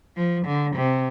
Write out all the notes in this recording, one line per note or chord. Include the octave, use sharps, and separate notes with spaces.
F3
D3
C3